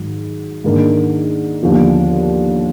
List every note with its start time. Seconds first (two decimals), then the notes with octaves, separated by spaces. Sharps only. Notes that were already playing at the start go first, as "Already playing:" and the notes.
Already playing: G#2 D#3 F#3
0.64 G#2 D#3 A#3 D4
1.62 D#2 D3 F3 B3